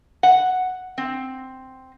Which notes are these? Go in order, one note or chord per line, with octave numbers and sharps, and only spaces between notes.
F#5
C4